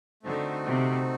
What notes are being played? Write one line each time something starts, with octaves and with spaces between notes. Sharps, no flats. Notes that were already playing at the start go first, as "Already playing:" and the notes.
D3 A3 C4 D#4 F#4
C3